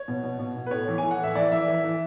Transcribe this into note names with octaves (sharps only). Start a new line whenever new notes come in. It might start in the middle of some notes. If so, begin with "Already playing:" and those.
Already playing: C#5
B2
B2
B2
B2
B4
A2 C#5
E3
E3 G#5
F#5
A2 E5
E3 D5
E3 E5
E3
E3